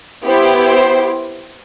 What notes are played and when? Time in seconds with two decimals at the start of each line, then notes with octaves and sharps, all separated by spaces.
0.24 B3 E4 G4 C5
0.64 C5